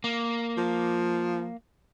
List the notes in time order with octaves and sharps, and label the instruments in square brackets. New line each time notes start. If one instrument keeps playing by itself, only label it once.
[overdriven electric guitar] A#3
[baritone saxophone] F3